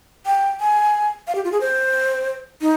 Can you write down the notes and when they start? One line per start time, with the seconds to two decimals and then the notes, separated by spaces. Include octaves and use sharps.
0.26 G5
0.60 G#5
1.27 F5
1.35 G4
1.44 F4
1.52 G#4
1.61 C5
2.61 D#4